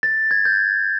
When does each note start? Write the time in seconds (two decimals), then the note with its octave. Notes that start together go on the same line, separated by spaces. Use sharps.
0.03 A6
0.31 G#6
0.45 G6